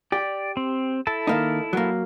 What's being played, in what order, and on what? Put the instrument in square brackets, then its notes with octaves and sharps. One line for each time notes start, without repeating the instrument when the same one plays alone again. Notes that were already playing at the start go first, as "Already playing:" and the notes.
[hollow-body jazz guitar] G4 [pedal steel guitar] D5
[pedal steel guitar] C4
E4 A4 A5
[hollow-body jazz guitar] D#3 A#3 D#4
F#3 A#3